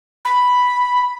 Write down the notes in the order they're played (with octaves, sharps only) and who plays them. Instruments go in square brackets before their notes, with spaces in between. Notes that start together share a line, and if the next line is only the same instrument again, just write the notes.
[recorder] B5